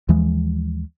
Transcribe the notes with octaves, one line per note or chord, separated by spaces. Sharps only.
D#2 E3 F3 G#3